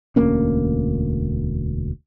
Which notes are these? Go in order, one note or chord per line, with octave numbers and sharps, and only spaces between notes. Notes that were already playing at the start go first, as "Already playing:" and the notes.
E1 D2 A#3 C#4